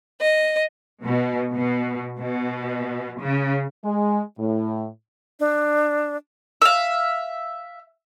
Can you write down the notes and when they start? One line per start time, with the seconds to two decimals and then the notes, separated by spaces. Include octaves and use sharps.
0.20 D#5
1.03 B2
1.53 B2
2.19 B2
3.19 C#3
3.85 G#3
4.39 A2
5.40 D4
6.62 E5 F5